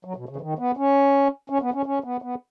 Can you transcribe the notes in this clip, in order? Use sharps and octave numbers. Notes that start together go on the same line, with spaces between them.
F#3
B2
C#3
E3
D#3
B3
C#4
C#4
B3
C#4
C#4
B3
B3